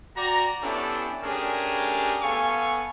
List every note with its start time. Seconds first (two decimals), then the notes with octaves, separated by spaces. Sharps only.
0.16 F#4 D5 G5 A#5
0.62 B3 C#4 D4 E4 G4 A4
1.23 A3 C#4 D4 G4 G#4 A#4
2.22 B3 A4 F5 G#5 C#6